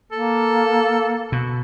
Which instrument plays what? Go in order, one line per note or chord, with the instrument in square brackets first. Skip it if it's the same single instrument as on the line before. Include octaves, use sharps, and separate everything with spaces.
[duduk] A#3 [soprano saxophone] A4
[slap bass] B2